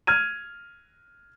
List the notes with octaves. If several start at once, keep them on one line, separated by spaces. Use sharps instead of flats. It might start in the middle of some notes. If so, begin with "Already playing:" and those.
F6 G#6 D#7